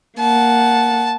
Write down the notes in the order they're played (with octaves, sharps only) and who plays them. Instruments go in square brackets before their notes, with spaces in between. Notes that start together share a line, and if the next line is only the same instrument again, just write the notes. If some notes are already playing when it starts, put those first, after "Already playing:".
[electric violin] A#3 F#5 [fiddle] A5